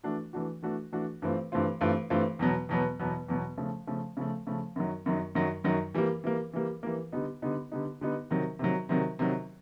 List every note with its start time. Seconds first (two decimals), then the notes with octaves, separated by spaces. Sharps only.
0.03 E3 A3 D4 F#4
0.33 E3 A3 D4 F#4
0.62 E3 A3 D4 F#4
0.92 E3 A3 D4 F#4
1.22 G2 E3 A3 C4 F4
1.52 G2 E3 A3 C4 F4
1.81 G2 E3 A3 C4 F4
2.10 G2 E3 A3 C4 F4
2.39 E2 B2 F#3 B3
2.69 E2 B2 F#3 B3
3.00 E2 B2 F#3 B3
3.28 E2 B2 F#3 B3
3.58 C#3 F3 A3
3.87 C#3 F3 A3
4.17 C#3 F3 A3
4.47 C#3 F3 A3
4.76 F#2 D#3 F#3
5.06 F#2 D#3 F#3
5.35 F#2 D#3 F#3
5.64 F#2 D#3 F#3
5.94 E3 G3 A#3
6.24 E3 G3 A#3
6.53 E3 G3 A#3
6.83 E3 G3 A#3
7.12 D3 G3 B3 D#4
7.42 D3 G3 B3 D#4
7.72 D3 G3 B3 D#4
8.01 D3 G3 B3 D#4
8.30 C3 D#3 F#3
8.59 C3 D#3 F#3
8.89 C3 D#3 F#3
9.19 C3 D#3 F#3